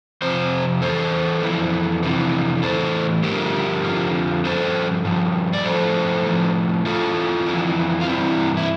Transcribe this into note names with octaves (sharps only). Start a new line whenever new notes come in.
F2 C3 F3 C5
E2 E3 A4 C5
F2 E3
F2 C3 E3
A2 E3 A4 C5
G2 D3 F3 G4 A#4
F2 D3 F3
G2 F3 A4 C5
G2 F3
D5
A2 F3 A4 C5
A2 F3
E2 E3 F4 A4
F2 E3
F4
G2 E3 C4 E4
E4